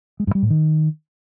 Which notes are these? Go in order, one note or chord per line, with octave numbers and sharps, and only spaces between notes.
G#3
G2
G3
A2
D#3